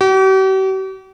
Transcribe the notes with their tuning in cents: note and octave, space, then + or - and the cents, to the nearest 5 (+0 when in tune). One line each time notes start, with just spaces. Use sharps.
G4 -45